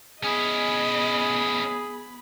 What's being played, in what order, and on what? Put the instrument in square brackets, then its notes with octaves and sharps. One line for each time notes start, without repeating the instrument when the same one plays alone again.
[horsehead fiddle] B3 B5 [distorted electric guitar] C#4 E4 [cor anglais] G#4 [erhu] D#5